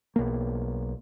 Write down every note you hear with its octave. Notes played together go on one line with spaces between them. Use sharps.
B1 A#3